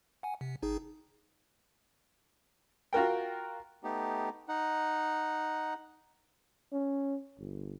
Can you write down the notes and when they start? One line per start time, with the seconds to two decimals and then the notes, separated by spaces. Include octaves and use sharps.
0.23 F#5 G#5
0.41 C3
0.62 G#1 D#4 G#4
2.93 F4 F#4 A#4 G5
3.84 A3 B3 D#4 G4
4.48 D#4 F#5
6.72 C#4
7.39 G1